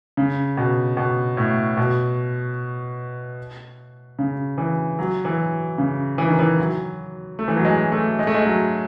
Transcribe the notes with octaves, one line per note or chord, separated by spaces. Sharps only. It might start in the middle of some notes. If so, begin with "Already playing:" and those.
C#3
B2
B2
A2
B2
C#3
E3
F#3
E3
C#3
E3
D#3
E3
F#3
A3
E3
F#3
G#3
A3
G#3
A3
G#3
F#3